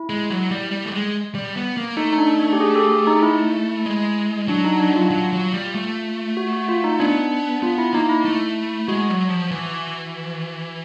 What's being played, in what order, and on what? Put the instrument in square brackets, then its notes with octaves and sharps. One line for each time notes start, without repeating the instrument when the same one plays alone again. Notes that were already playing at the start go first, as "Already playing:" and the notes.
Already playing: [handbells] E4
[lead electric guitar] G#3
F#3
G3
G3
A3
G#3
G3
B3
A#3
[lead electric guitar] A3 [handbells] D#4
[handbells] D#4
D4
D4
G4
G#4
G4 A4
G#4
D#4
E4
[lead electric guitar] G#3
[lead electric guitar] F#3 [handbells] D4
[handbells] D#4
D4
F4
[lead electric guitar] F#3
F#3
G3
A3
[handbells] F#4
F#4
F4
D#4
[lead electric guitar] B3 [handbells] D4
[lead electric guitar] B3 [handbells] F4
[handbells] E4
[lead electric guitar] A#3 [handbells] D#4
[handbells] E4
[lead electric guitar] A3
[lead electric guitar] G#3 [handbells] F#4
[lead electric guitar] F#3
F3
E3